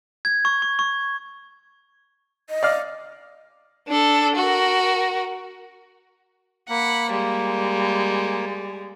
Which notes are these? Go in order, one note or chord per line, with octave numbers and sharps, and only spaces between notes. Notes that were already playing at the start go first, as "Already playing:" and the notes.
G#6
C#6
C#6
C#6
D#5
D5 F5 F6
D4 A4
F#4 A#4
A#3 F#5 B5
G3 G#3